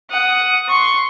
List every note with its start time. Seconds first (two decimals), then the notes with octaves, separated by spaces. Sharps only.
0.10 F#5 D#6
0.68 C6 C#6